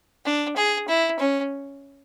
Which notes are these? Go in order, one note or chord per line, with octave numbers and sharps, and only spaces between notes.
D4
G#4
E4
C#4